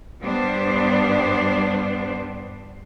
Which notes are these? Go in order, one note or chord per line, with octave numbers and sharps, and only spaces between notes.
G2 G3 B3 D4 C5